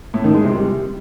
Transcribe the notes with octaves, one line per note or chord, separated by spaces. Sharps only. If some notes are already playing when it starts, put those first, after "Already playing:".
A2
D#3
G#3
C3
G3